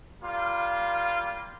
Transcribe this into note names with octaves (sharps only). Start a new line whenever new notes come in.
G3 A#3 F4